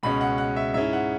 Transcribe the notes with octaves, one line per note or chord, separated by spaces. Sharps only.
C#2 B2 G#3 C#4 B5
F#5
F#5
E5
G#2 G#3 C#4 E4 E5
F#5